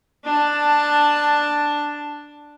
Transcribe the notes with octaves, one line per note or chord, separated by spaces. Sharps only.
D4 A5